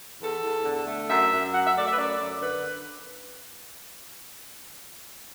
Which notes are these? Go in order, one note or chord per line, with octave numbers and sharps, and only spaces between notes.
E2 A4
E2
D3
A3
F#2 E5
F#2
F#3 F#5
E5
A3 D5
E5
B4
F#2 D5
F#2
D3 B4